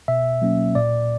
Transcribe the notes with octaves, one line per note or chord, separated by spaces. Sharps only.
B2 E5
F#3 A#3 C#4
A#2 D5